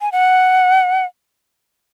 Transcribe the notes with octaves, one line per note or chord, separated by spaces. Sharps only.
G#5
F#5